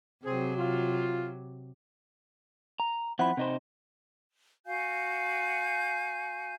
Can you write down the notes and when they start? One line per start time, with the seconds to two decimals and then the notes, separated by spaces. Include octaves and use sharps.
0.24 C3 F#3 C4 G#4
0.56 F4
2.80 A#5
3.19 F3 C4 E4 F#5 B5
3.37 C3 D#4 C5
4.66 F#4 F5 G#5 G6